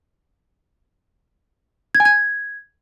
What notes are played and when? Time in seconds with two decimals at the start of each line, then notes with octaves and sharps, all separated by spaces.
1.95 G#6
2.00 G#5
2.05 G#6